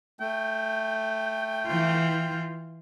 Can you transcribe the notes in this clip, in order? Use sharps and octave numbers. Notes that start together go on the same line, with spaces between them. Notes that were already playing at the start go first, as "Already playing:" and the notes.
A3 G5
E3 F4